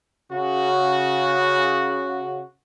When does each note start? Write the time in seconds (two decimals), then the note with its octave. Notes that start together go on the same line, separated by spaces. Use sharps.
0.32 C#3 F#4